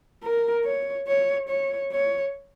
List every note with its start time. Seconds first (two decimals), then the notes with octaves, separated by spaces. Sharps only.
0.23 A#4
0.65 C#5
1.08 C#5
1.49 C#5
1.92 C#5